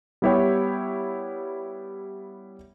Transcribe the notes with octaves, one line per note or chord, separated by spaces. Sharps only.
G3 B3 E4 G4 C#5 G5